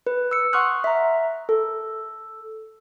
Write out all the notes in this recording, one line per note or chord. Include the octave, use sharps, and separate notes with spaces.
B4
E6 C#7
F#5 C6 C#6 D#6 F6 F#6
E5 A#5
A4